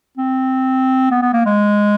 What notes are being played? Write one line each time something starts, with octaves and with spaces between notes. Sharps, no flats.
C4
B3
B3
A#3
G#3